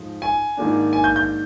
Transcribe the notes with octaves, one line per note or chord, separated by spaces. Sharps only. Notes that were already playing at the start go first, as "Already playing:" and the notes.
Already playing: G#2 F3 G#3 D#4
G#5
G#2 D#3 A#3 D4
G#5
G6
G6